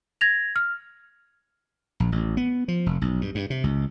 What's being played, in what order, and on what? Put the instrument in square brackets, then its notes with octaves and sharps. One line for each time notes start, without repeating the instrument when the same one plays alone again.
[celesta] G#6 A#6 F7
F6
[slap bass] A#1
A1
B3
F3
F1
B1
G2
G2
C3
C#2